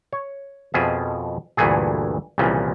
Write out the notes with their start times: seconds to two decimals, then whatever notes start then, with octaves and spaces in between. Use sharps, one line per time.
0.13 C#5
0.74 F2 B2 F3 G#4 E5
1.57 D2 G2 A#2 E3 A3 G#4
2.38 C2 A#2 C#3 E3 F3